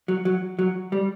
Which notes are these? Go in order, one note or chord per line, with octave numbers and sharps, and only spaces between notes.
F#3
F#3
F#3
G3